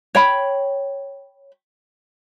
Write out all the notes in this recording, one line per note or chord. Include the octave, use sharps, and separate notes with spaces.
C#5 G5 B5